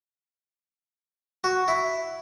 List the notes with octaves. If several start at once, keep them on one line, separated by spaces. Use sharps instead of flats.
F#4
E4